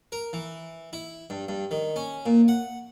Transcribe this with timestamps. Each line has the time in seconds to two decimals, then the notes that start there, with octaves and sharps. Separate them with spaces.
0.12 A#4
0.33 E3
0.93 E4
1.30 G2
1.49 G2
1.71 D#3
1.96 C#4
2.26 A#2
2.48 F#5